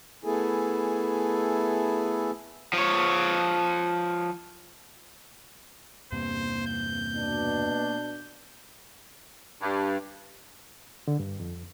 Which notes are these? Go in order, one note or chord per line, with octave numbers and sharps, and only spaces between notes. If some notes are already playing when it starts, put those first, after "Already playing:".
A3 B3 E4 G#4 A4 G#5
F3 C#5
E2 G2 C3 A#3 C5
G6
B2 D4
G2
D3
G2
F2